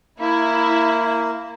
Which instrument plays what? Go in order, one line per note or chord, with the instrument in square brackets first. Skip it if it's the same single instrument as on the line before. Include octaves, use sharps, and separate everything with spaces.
[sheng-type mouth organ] A#3 [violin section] E4